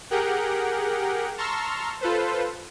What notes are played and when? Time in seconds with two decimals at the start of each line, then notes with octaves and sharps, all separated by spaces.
0.10 G4 G#4 A#4 F#5 G5
1.37 A5 A#5 C6 C#6 E6 F6
2.01 F4 A4 B4 C5